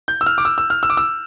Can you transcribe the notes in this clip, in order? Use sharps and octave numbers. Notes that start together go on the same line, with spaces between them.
G6
E6
F6
D6
E6
E6
F6
E6
D6
E6